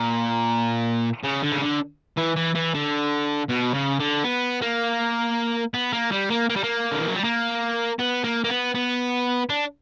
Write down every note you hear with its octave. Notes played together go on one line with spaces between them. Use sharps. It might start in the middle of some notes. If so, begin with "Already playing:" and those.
Already playing: A#2
C#3
D3
C#3
D3
E3
E3
E3
D3
B2
C#3
D3
B3
A#3
B3
A#3
G3
A#3
A#3
G3
A#3
D3
E3
F#3
G3
A#3
B3
A#3
A#3
B3
B3
D4